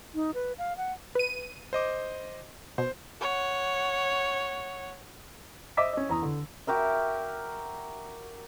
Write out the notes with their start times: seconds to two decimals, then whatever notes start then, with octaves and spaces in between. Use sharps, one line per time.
0.15 D#4
0.34 B4
0.58 F5
0.77 F#5
1.15 B4 D#7
1.73 C5 D#5 D6
2.78 B2 C5
3.21 C#5 F#5
5.77 C5 D#5 E5 D6 E6 B6
5.93 C#4 D#5
6.09 E2 A#5 D#6
6.22 D3
6.67 F#4 G4 A#4 E5